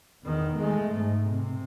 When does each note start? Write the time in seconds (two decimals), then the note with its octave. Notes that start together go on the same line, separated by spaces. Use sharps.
0.24 E2 D#3
0.59 G#3 A3
0.94 G#2
1.31 C3